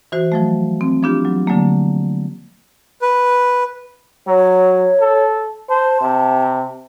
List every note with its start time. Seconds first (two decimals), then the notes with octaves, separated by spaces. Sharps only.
0.12 E3 F#4 C5
0.32 F3 F#3 A3
0.81 C4
1.03 F3 B3 D4 F4 G4
1.25 F#3
1.47 D3 F#3 A3 A#3
3.02 B4
4.27 F#3 C#5
5.00 A4
5.70 C5 A5
6.01 C3